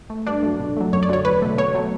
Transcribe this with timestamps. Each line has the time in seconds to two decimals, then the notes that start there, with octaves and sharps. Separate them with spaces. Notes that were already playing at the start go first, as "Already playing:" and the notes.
0.10 A3
0.27 G2 D4 D5
0.43 F#3 A3
0.60 B2
0.77 F#3 A3
0.92 F#2 C#5
1.03 D5
1.09 D3 F#3 A3 C#5
1.25 E2 B4
1.42 B2 A3
1.58 B2 C#5
1.75 F#3 A3